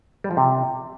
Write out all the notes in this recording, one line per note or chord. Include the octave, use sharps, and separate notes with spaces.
G3
F3
C3